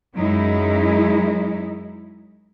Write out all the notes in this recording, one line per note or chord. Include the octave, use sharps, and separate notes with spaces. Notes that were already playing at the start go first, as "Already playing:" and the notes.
F#2 F#3 G#3 D#4 E4